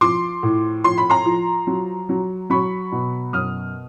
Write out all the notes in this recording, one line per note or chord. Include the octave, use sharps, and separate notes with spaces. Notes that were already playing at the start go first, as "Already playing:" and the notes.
F3 C6 D6
A2
F3 C6
B5
A#5 C6
F3
F#3
F#3
F#3 B5 C#6
B2
F#2 D#6 F6